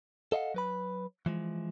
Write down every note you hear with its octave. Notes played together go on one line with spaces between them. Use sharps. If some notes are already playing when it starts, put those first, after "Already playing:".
A4 D#5 F5 F#5
F#3 B4 B5
E3 F3 G#3